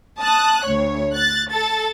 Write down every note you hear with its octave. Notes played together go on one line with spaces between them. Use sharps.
A5 D#6 F#6
D2 C#5
F#6 A6
A4 A6